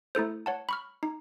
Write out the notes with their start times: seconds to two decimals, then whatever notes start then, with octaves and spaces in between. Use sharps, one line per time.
0.15 A3 E4 A4 C5
0.46 C#5 F#5 A5
0.69 B5 C#6 F6
1.03 D#4